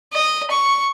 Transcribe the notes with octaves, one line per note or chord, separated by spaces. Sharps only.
D#5
C#6